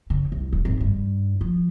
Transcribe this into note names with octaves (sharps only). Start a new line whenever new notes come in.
C#3
C2
D#1
G#1
G2
F3